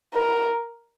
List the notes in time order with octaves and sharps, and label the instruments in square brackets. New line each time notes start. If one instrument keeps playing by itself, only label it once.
[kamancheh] A#4